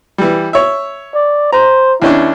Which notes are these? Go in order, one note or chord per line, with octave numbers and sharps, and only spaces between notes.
E3 G3
C#5 E5
D5
C5 A#5
D#2 C#4 D4 E4